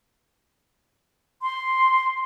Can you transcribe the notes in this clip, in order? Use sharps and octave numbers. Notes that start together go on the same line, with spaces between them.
C6